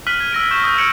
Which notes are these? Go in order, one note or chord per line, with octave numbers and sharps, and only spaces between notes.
F6 F#6 B6 D#7 F#7
G#6
E6 A#6 D7
C#6 G6 G#6 E7
D#6 G6
F6 G#6 C#7 D7 F#7